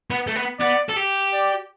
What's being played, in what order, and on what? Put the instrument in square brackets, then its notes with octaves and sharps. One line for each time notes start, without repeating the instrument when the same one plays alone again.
[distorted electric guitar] B3
A3
B3
[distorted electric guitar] B3 [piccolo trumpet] D5
[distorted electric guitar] A4
G4
[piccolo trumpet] D5